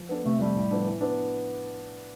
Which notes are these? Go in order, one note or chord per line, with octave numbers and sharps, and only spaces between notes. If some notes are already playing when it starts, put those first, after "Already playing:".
Already playing: F3
B3 D4 A4
C3 A3
F3 G3 A3
A2
F3 B3 D4 A4
E3
B3 D4